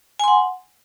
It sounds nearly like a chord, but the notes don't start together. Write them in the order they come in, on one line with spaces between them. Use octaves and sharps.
G#5 C6 F#5